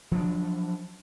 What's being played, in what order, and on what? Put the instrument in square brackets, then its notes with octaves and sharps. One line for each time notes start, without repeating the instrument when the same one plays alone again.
[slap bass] F3 F#3 B3 D4